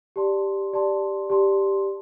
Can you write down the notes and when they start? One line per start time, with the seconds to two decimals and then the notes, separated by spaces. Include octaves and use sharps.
0.16 G4 D5 A5 C6
0.73 G4 D5 A5 C6
1.30 G4 D5 A5 C6